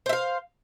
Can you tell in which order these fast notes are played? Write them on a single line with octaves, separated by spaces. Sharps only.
C5 E5 F5